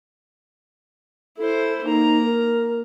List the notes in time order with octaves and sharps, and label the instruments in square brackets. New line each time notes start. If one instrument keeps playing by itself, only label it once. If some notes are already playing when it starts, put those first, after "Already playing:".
[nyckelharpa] E4 C5 [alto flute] A4
[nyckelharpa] A#3 A#5 [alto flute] D#4
[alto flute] A#4